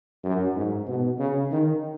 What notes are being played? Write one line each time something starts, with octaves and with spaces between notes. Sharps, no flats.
F#2
G#2
B2
C#3
D#3